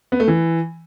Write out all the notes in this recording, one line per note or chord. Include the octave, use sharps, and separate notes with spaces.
B3
A3
E3